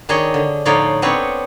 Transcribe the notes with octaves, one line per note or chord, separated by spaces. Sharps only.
D#3 D4 G#4 C#5 D#5
D3
A2 D3 F3 D#4 C#5 D5
B3 C4 D4 C#5